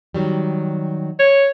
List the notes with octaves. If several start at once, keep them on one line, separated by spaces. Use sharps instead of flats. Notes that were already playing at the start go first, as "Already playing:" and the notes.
D#3 F#3 G3
C#5